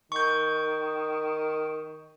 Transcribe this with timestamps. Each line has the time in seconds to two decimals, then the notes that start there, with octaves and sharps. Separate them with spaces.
0.12 D#3 C#6 G6